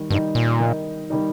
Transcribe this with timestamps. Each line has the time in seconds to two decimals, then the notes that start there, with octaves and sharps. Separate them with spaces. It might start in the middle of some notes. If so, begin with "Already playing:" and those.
Already playing: D#3 G3 D#4
0.10 G2 D#3 G3 D#4
0.35 A#2
0.60 D#3 G3 D#4
1.10 D#3 G3 D#4